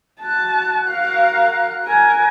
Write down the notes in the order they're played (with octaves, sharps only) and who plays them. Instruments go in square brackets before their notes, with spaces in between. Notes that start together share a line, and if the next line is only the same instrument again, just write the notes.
[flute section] F#4 F#6 [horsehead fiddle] A5
[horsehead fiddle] A#4 F5
A#4 G#5